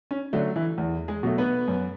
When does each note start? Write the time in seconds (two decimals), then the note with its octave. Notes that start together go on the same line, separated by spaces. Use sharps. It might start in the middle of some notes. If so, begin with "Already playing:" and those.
0.11 C#4
0.33 D3 F#3 A3 D4
0.56 E3 E4
0.78 E2
1.08 G#3 G#4
1.23 B2 F#3 A3
1.38 B3 B4
1.68 F#2